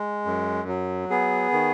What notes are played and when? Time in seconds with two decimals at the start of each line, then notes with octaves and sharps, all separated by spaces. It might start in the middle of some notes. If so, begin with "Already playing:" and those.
Already playing: G#3
0.25 F#2
0.68 F#3
1.10 B3 G#4
1.52 D#3